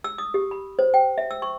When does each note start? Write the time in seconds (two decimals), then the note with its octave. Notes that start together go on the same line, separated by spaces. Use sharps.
0.04 E6
0.18 D#6
0.34 G4
0.51 B5
0.79 C5
0.94 G5
1.18 E5
1.31 E6
1.42 C#6